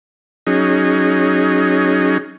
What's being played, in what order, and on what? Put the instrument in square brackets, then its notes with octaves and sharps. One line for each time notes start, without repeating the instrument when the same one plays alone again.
[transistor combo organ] F#3 C#4 D#4 G#4